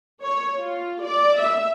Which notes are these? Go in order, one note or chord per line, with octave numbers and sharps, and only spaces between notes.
C#5
F4
D5
E5